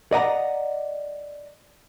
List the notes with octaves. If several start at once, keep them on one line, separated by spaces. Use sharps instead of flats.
D5 D#5 F#5 A#5